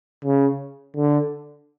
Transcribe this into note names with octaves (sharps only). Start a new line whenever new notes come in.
C#3
D3